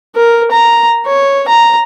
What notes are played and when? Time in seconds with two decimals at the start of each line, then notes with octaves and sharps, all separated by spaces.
0.16 A#4
0.51 A#5
1.06 C#5
1.48 A#5